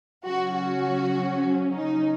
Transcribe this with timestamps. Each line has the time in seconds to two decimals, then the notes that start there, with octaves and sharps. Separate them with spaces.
0.25 C#3 F#3 C#4 F#4
0.54 F#4
1.74 D#4